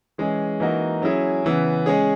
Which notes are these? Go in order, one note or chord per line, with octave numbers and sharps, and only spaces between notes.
E3 G#3 C#4 G#4
E3 A#3 D#4 F#4
F#3 C#4 E4 G#4
C#3 E3 B3
G#3 C#4 G#4